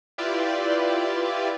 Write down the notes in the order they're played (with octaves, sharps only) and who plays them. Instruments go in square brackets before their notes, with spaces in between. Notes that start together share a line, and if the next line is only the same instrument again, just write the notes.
[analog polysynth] E4 F4 G4 B4 D5